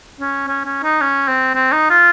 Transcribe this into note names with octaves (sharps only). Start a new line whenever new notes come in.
C#4
C#4
C#4
D#4
C#4
C4
C4
D#4
F4